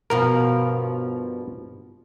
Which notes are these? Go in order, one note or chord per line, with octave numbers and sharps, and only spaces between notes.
G2 B2 F3 A#4